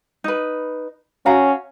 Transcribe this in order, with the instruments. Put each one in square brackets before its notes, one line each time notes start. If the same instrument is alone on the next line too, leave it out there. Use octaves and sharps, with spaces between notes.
[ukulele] D#4 B4
[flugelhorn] C#4 [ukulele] F#4 F5 A#5